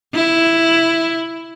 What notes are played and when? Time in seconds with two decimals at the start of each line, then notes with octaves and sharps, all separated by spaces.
0.14 E4